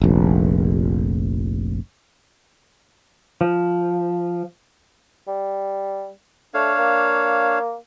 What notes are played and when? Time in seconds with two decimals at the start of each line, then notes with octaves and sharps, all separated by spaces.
0.02 F1 A#1
3.41 F3
5.27 G3
6.54 A3 D4 C#5 F5
6.78 A#3